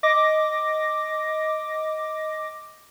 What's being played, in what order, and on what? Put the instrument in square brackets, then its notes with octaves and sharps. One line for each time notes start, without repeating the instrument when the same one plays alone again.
[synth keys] D#5 D6 A#6